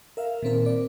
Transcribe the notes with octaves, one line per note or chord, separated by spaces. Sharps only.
A#4 E5 F5
A#2 D#3 C4 A#4
C4 D5